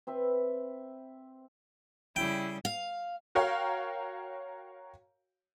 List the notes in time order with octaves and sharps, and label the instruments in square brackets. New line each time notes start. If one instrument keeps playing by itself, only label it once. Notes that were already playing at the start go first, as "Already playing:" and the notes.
[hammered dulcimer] C4 B4 E5
[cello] C#3 G3 [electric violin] E4 [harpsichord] G5
[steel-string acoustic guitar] F5
[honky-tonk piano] F#4 A#4 C#5 F5 G5